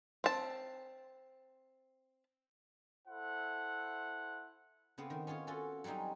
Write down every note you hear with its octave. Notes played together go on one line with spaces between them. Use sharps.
C4 A5
E4 A4 C5 F#5
C#3 B3 C4
D#3
C#4 F4 G#4 C#5
C#4 F4 F#4 A4
F#3 G3 C4 C#4 D#4